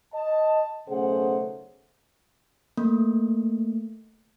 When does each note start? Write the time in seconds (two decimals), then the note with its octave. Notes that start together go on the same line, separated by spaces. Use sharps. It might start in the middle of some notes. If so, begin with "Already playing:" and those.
0.13 D#5 A5
0.88 B1 C#3 A3 G#4 C5 F#5
2.77 A3 A#3